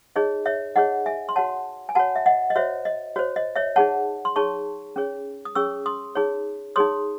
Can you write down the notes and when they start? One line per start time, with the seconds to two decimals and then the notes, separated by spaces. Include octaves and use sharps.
0.16 D#4 G#4 C#5 D#5
0.46 C#5 E5
0.76 D#4 G#4 C#5 D#5 F#5
1.06 E5 G#5
1.29 C6
1.36 F#4 C#5 F#5 A5
1.89 G#5
1.95 F#4 C#5 F#5 A5
2.16 E5
2.26 D#5 F#5
2.50 D#5
2.56 F#4 C5 C#5 E5
2.85 D#5
3.16 F#4 C5 C#5
3.36 D#5
3.56 C#5 E5
3.76 D#4 G#4 C#5 F#5 A5
4.25 C6
4.36 D#4 G#4 C#5 A5 C#6
4.96 C#4 G#4 C#5
5.45 D#6
5.55 C#4 G#4 C#5 C#6 E6
5.86 C6 D#6
6.15 D#4 G#4 C#5
6.76 D#4 G#4 C#5 C6 D#6